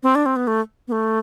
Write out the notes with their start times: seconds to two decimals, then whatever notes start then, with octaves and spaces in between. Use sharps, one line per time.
0.03 C4
0.15 D4
0.26 C4
0.36 B3
0.47 A3
0.88 B3
0.92 A3